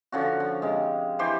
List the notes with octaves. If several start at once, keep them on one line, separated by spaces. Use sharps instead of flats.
D3 F3 C#4 F#4
F3
C3 G#3
E3 G4 C5